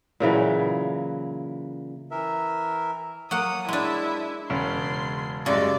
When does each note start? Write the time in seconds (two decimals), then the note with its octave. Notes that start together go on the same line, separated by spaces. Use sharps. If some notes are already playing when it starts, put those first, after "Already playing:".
0.20 A#2 C#3 E3 F#3
2.11 E3 A#4 E5
3.31 F#3 A#3 F#5 D#6
3.69 G#3 D4 E4
4.50 E1 C#3 C#4 C6
5.46 F#2 C#3 G3 G#3 D5